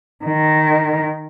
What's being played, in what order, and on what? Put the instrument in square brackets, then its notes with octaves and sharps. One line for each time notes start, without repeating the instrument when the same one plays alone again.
[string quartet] D#3